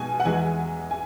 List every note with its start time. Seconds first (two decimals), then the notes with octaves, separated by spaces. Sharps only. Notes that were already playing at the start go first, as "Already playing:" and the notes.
Already playing: B2 G#3 G#5
0.20 F#5
0.25 E2 E3 G#3 G#5
0.91 G#5